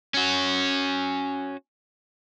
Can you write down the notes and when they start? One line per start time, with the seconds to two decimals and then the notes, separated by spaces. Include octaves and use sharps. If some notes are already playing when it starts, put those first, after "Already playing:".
0.14 C#4 F#4